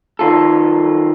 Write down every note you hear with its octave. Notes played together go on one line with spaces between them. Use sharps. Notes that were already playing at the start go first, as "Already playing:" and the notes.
D#3 F4 A4